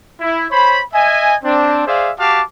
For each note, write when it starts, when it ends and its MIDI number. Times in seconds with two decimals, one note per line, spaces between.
0.20 0.45 64
0.51 0.80 72
0.51 0.80 73
0.51 0.80 83
0.93 1.34 75
0.93 1.34 76
0.93 1.34 80
1.43 1.85 60
1.43 1.85 62
1.86 2.11 68
1.86 2.11 72
1.86 2.11 74
1.86 2.11 76
1.86 2.11 77
2.17 2.41 66
2.17 2.41 67
2.17 2.41 77
2.17 2.41 81
2.17 2.41 86